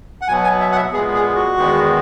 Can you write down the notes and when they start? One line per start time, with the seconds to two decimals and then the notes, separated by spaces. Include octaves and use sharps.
0.21 F#5
0.28 B2 F#3 B3 G#5
0.44 G#5
0.61 E5
0.72 F#5
0.76 E5
0.92 A#2 G#3 B3 G#4
1.14 G#4
1.35 F#4
1.57 E2 D#3 G#3 B3